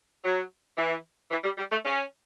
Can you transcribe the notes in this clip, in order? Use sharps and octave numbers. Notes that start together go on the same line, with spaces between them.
F#3
E3
E3
G3
G3
A3
C#4